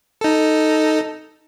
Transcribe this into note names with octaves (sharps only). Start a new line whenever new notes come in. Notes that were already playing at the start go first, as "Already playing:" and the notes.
D#4 A4